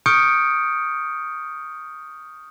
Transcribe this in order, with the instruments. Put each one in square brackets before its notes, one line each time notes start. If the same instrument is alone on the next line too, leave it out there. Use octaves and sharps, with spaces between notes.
[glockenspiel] C#6 D#6 F6 G6 C#7 D7